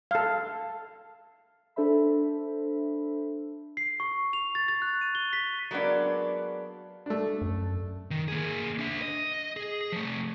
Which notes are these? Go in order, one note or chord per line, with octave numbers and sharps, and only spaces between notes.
A4 F5
D4 A4 C5 E5 B5
C7
C#6
F7
A6
A6
F#6
D#7
G7
B6
F#3 G#3 A#3 B3 D4
A3 D4
F#2
D#3
A#3 G#4
D4 E5
D#5
G#4
F3 A3